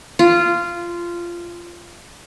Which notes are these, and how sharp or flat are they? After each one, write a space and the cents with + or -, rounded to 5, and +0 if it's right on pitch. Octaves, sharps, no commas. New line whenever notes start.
F4 -15